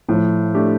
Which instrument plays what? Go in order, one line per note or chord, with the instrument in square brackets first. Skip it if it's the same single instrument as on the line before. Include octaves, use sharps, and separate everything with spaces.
[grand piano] A2 [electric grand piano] F3
[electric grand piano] A3 D4 G4